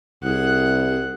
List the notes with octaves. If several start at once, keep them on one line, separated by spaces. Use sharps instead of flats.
C2 G#4 F#5